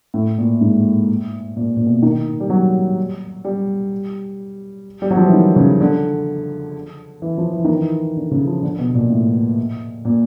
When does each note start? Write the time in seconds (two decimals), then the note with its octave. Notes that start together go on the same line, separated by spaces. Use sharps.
0.14 A2
0.38 A#2
0.61 G#2
1.56 A#2
1.77 A#2
1.87 B2
2.02 D#3
2.40 G3
2.50 F#3
3.44 G3
5.02 G3
5.11 F#3
5.17 F3
5.25 E3
5.33 D#3
5.56 C#3
5.81 D3
7.22 E3
7.38 F3
7.53 E3
7.65 D#3
7.77 E3
8.16 D3
8.31 C#3
8.47 F3
8.63 D3
8.78 B2
8.94 A#2
9.10 A2
10.05 A#2